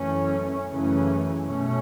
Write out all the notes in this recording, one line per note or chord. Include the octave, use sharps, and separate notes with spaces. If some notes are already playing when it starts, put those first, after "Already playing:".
Already playing: F#2 E3 A3 C#4
F#2 C#3 E3 A3 C#4
B2 A3 C#4